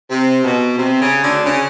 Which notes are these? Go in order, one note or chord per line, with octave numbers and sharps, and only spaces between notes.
C3
B2
C3
C#3
D2 D3
C#3